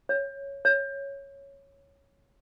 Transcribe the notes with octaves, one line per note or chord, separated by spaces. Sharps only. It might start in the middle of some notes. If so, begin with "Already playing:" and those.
C#5
C#5